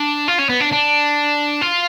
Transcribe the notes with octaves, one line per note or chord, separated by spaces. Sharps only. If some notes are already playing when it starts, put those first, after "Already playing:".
Already playing: D4
F4
C#4
B3
D4
D4
F4